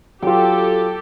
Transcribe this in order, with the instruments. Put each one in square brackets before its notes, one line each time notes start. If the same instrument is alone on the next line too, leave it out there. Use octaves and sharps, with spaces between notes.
[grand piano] F#3 F4 [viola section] G4 A4 [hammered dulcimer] G5